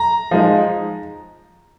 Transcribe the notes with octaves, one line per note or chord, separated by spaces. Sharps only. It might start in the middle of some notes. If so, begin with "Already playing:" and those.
Already playing: A#5
F3 G#3 D#4